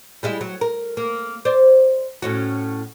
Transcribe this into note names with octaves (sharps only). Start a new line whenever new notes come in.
G3 G#3 E4
F#3
A#4
A#3
C5 D5
A2 C#4 F#4